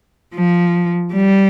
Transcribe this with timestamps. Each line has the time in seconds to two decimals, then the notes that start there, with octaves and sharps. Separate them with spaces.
0.34 F3
1.13 G3